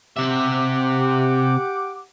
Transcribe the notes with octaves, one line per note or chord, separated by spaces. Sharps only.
C3 G4 E5 F#5 D6